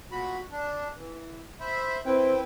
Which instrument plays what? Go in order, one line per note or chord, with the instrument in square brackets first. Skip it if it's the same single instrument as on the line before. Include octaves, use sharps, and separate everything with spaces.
[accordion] A#2 F#4 B5
D4
E3
C5 E5 B5
[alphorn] C4 [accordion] E4 B4 G5